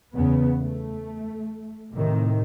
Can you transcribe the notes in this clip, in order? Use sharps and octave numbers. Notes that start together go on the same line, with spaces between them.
E2 C#3 B3
A3
A2 C3 D#3